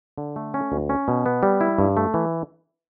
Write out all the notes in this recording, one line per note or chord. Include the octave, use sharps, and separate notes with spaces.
D3
A3
C#4
D2
C#4
B2
B3
G3
E4
G2
A3
E3